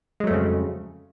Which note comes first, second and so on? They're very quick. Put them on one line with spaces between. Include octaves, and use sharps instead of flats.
G#3 F#3 A3 F2 C#3